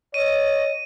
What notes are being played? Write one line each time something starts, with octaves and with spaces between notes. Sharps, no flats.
C#5 D#5 D#7